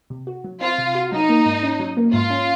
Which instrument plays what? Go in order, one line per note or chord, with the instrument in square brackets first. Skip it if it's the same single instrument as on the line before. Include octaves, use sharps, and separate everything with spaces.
[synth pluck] C3
F#4
F#3
[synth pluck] C4 [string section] F4
[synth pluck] C3
F#4
[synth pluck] F#3 [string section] D#4
[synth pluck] A#3
G#2
C#4
F#3
A#3
[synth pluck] G#2 [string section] F4
[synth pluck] C#4